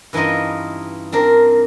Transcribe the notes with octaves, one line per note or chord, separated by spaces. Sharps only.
G2 E3 C#4 D#4 F4 D#5
C4 D4 A#4